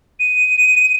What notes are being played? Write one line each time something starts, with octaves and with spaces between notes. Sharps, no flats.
D#7